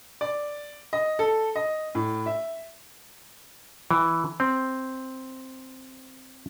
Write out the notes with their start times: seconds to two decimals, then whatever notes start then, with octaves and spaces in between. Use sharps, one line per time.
0.21 D5
0.93 D#5
1.19 A4
1.56 D#5
1.95 A2
2.26 E5
3.91 E3
4.40 C4